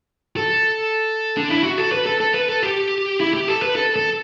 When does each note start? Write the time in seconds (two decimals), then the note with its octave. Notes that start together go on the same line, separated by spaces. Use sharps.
0.37 A4
1.37 D4
1.50 E4
1.63 F#4
1.78 A4
1.92 B4
2.06 A4
2.20 A4
2.34 B4
2.49 A4
2.63 G4
3.20 E4
3.34 G4
3.48 A4
3.62 B4
3.76 A4
3.96 A4